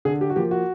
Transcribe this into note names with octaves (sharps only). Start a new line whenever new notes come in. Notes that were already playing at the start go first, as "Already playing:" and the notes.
D3 G#4
G4
F#4
F3 A#3 G4
F#4